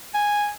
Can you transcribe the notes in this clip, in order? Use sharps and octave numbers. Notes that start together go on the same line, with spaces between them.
G#5